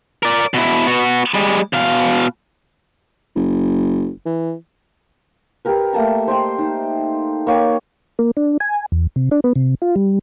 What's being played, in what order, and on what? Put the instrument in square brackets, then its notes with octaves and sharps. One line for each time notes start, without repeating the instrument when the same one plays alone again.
[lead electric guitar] A#4 D5
B2 E4
B3 F#4
G3 G#3
B2 F5
[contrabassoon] F#1
E3
[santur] G4 A#4 B4
A3 A#3 A5 A#5
C5 D#5 G5 C6
D#4
A#3 C#5 G5
[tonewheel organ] A#3
D4
G#5
E2
C3
D4
B3
C3
F4
G3